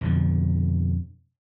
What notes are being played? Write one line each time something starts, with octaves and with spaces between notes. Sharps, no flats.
F2 B2 D3